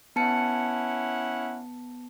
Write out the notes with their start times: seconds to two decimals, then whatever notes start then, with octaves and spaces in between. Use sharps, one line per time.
0.16 B3 C#4 E4 F#5 A5 C#7